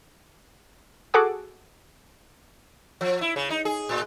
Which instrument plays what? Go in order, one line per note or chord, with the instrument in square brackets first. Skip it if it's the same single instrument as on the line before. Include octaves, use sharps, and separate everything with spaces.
[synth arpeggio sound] F#4 G#4 A4 F#5 D6
[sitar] F3
E4
C#3
D#4
G#4
A2